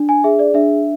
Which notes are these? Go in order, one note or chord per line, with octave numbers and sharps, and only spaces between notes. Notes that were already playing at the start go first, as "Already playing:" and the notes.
Already playing: D4
G#5
G#4 E5
D5
D4 E5